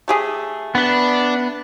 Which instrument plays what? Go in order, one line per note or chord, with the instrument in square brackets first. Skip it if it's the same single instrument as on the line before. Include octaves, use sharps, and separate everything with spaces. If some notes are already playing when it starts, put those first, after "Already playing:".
[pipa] A3 G4 G#4
[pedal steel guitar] B3 B4 [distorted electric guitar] D4